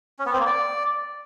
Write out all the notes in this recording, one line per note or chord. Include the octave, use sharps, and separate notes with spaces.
C#4
B3
C4
A#3
D5